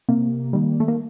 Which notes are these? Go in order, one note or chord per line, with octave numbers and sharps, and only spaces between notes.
C3 A#3
D#3 G3
A3
A#3